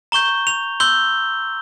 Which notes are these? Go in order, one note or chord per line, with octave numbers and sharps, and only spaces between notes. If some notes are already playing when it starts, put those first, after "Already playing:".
A#5 C#6 G6 G7
F7
C6 E6 G6 G7